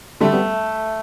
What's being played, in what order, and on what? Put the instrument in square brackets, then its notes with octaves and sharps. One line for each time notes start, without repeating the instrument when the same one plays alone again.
[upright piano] D3 G3 [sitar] A3
[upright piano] G3 B3